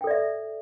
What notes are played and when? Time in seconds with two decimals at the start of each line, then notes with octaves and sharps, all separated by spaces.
0.01 G5
0.04 A4
0.07 D5
0.11 E5